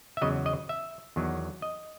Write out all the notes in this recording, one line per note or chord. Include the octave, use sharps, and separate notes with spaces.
E5
E2 C#3 F#3 D#5
D#5
E5
E2 D#3 F#3
D#5